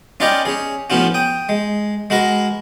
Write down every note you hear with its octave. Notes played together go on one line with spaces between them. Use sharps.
C#4 F4 B4 D5 D#5 G5
C#4 G#4
A2 F3 B3 C#4 F4 F#4
G5 D#6
G#3
G#3 F#4 A#4 B4 A#5